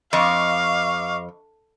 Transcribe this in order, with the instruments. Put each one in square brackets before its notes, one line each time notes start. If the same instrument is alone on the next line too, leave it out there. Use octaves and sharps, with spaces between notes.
[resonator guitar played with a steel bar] F2 [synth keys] D#5 C#6 D6 [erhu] F5